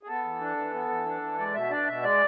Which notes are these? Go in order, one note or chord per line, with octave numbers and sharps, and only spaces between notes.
G#4
B3 A4
E3
D4
E3
B3
E3
D4
E3
G#3 D5
B2 E5
D4 D5
B2 E5
G#3 D5